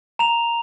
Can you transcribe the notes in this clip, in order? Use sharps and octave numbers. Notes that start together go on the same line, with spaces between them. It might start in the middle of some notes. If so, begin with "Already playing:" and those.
A#5 F7